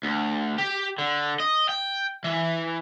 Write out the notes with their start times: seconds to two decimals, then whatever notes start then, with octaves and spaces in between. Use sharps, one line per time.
0.04 D2
0.58 G4
0.98 D3
1.40 D#5
1.69 G5
2.24 E3